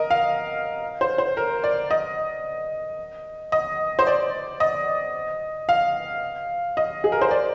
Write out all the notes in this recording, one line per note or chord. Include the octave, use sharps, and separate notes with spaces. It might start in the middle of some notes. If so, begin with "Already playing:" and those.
Already playing: A#4 D#5
F5
C5
C5
A#4
D5
D#5
D#5
C5
D5
D#5
F5
D#5
G#4
A#4
C5
D5